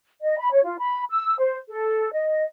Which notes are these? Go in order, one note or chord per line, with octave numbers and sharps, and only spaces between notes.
D#5
B5
C#5
F4
B5
E6
C5
A4
D#5